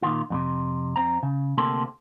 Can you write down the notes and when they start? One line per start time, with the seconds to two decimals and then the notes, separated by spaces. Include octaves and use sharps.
0.02 A#2 D#3 F4
0.30 F2 A2 C3
0.96 F2 C4 A#5
1.23 C#3
1.58 D2 C3 A#3 C4 A4 C6